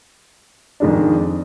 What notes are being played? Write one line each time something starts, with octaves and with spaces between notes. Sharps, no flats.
F2 D#3 G#3 D4